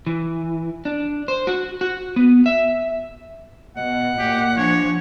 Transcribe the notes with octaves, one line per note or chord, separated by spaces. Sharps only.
E3
D4
C5
F#4
F#4
B3
E5
B2 D#5 F#5
A#2 G4
F3 D4 C#5 G#5